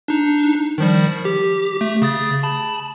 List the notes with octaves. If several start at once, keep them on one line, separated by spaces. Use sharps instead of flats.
D4 D#4
D#3 F3 G3
G4
A3
C#3 D#6 A6
A5 B5